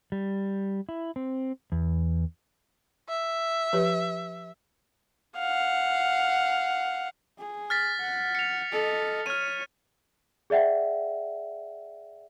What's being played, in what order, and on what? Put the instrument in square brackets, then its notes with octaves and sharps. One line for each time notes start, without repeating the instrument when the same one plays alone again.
[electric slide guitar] G3
E4
C4
E2
[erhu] E5
[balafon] F3 G4 B4
[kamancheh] F5 F#5
[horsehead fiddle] G#4
[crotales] F6 A6 B6
[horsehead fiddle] F#5
[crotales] C#7 F7
[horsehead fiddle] A4 D#5
[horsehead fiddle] C#5 [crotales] F6 D#7
[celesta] G#4 D5 E5 F#5 G5